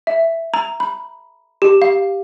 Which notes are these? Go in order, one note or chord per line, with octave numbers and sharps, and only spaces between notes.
E5
A#5
B5
G4
F5